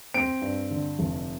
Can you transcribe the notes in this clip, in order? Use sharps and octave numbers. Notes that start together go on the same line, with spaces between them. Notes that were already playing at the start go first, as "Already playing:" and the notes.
C4 D7
G2
D3
F1